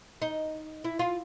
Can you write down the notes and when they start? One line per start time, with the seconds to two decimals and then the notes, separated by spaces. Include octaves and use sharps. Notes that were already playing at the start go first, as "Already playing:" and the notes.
0.22 D#4
0.84 E4
0.99 F4